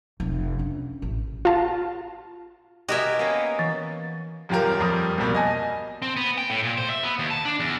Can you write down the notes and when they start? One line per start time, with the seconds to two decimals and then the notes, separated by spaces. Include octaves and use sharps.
0.20 F1
0.59 C#4 D4
1.02 A1
1.45 F4 A5
2.89 F#4 G4 A#4 D#5 E5 F#5 G#5
3.19 A#3 B3 C#4
3.59 E3
4.49 D#1 F#2 F4 G4 A#4
4.80 F2 G3 D#6
5.18 C2 F2 B2 G3 A#3
5.35 D#5 G#5 A5
6.02 C4
6.17 B3
6.38 G5
6.50 A2
6.63 A#2
6.78 C5
6.90 E5
7.03 B3
7.19 D#2
7.31 A5
7.45 D4
7.60 E2